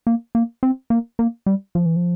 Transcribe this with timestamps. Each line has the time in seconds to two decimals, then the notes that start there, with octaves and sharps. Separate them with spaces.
0.07 A#3
0.35 A#3
0.63 C4
0.90 A#3
1.19 A#3
1.46 G3
1.75 F3
1.85 E3
1.96 F3